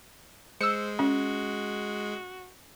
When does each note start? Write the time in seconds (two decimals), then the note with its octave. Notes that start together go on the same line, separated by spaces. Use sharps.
0.61 G#3 C5 E6 C#7
0.99 C#4 F#4